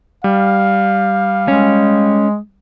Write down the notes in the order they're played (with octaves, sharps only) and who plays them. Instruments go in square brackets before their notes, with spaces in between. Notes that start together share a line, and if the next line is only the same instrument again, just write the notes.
[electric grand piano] G3 [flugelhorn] F5
[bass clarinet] G#3 [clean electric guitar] C#4